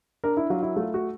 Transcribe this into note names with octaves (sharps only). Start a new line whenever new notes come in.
D4 A#4
E4
F#3 F4
E4
A3 F4
F#4